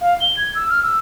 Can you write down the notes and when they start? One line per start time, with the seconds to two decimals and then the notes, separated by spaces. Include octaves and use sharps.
0.01 F5
0.21 G7
0.37 G#6
0.55 E6
0.70 F6
0.83 E6